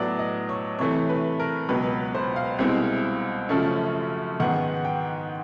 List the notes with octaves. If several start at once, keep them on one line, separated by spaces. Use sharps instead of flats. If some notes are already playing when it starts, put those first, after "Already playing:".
Already playing: A2 F#3 B3 D5
D#5
C#5
C3 E3 A3 C#5
B4
A#4
C#2 B2 F#3 B4
C5
F5
C2 B2 G#3 C4 E4
F#2 C#3 F3 A3 C#4
G#2 D#3 G#3 B3 F#5
G5